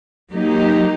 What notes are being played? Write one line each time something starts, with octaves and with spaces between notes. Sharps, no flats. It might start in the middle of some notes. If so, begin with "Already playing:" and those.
F#3 A#3 D#4 G4